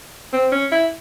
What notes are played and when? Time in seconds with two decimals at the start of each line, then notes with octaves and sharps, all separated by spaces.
0.33 C4
0.52 C#4
0.72 E4